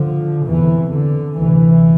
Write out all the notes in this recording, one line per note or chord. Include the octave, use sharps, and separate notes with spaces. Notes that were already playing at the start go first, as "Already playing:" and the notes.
Already playing: D3 F3
E2 C3 E3
D3
D2 C3 E3